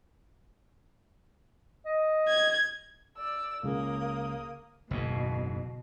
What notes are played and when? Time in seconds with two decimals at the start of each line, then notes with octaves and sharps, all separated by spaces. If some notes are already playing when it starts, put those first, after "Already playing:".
1.86 D#5
2.28 G#6
3.17 D5 E6
3.63 C#2 C#3 A#3 D#6
4.91 F#1 D#2 G#2 B2